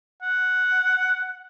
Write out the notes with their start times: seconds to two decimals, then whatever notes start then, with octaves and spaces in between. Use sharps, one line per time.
0.22 F#5